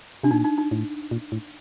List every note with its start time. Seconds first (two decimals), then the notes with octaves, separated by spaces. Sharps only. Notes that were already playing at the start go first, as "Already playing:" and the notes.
0.23 C3 D4
0.31 A#2 D#4
0.44 D#4
0.58 D#4
0.71 A2
1.11 A#2
1.32 A2